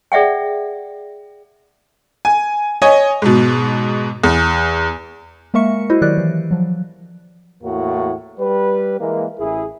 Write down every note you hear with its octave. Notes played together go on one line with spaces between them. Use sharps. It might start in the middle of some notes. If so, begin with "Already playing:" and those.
G#4 D5 E5 F#5 G5
G#5
C#5 D#5 G#5
G#2 B2
E2
G#3 A#3 A#4 E5 C#6 C#7
E4 F#4 C5 D#5
D#3 F#3 G4 D5 F#6
E3
F3 F#3
E2 A2 A#3 F#4
G3 B4
E3 G#3 A#3
A1 E4 G#4